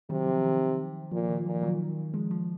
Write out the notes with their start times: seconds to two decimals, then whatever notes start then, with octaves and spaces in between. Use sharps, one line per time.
0.10 C3 D#3 F#3
0.27 F3
0.44 D#3
1.12 A#2 F3
1.29 D#3
1.46 A#2 F3
1.63 D#3 F#3
2.14 F3 G#3
2.31 F3